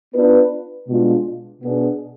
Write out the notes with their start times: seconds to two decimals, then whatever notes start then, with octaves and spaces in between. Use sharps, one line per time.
0.14 B3 D4 F4 B4
0.88 B2 G#3 D4 F4
1.61 B2 B3 D4 G#4